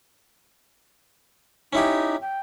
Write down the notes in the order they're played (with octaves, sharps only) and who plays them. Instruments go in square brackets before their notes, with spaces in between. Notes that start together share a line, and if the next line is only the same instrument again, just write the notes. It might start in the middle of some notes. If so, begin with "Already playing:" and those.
[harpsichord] C#4 E4 G4 [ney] D#4
[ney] G5